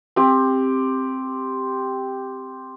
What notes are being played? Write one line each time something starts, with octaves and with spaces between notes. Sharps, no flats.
C4 G4